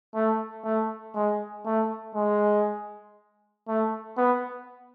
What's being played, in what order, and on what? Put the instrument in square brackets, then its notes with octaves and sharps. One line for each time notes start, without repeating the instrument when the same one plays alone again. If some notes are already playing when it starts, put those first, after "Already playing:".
[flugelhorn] A3
A3
G#3
A3
G#3
A3
B3